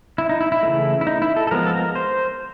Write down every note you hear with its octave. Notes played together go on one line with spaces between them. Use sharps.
E4
D#4
E4
E4
C#3 E3 A3
E4
D#4
E4
A4
A4
F3 G#3 B3 A#4
A4
A#4
C5